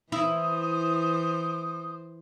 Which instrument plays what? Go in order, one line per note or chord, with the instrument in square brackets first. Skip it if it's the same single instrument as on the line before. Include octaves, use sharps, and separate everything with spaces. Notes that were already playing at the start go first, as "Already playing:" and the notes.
[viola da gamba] E3 C5 [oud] E4 [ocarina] D#6